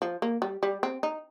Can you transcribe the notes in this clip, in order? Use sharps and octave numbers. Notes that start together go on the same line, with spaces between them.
F3
A#3
G3
G3
C4
D#4